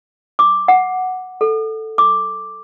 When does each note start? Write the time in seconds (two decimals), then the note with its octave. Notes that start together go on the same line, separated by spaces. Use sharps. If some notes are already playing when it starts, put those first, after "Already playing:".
0.39 D6
0.68 F#5
1.41 A4
1.98 D6